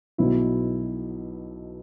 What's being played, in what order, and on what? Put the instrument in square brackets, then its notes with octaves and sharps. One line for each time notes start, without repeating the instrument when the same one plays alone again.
[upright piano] B1 B2 F#3 E4